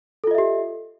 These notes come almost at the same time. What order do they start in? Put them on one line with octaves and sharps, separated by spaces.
A4 F4 D#5 E5 G4